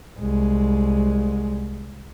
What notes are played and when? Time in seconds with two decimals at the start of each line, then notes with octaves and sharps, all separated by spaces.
0.19 C2 G#3